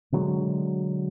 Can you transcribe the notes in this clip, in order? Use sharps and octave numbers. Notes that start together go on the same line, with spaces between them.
B2 D3 F#3 G#3